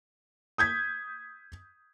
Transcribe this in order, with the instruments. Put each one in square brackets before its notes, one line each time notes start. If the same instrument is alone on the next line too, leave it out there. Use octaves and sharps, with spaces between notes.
[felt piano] D#6 G6 G#6 B6